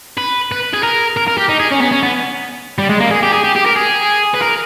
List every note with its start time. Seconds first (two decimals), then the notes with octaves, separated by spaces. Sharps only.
0.18 B4
0.51 B4
0.73 G#4
0.83 A#4
1.17 A#4
1.28 A#4
1.38 G4
1.49 D#4
1.59 G#4
1.71 C#4
1.81 B3
1.92 C#4
2.03 B3
2.78 G3
2.89 G#3
3.00 A#3
3.11 G#4
3.23 G4
3.33 G#4
3.44 G4
3.56 G4
3.66 A#4
3.76 G#4
4.34 B4
4.41 A#4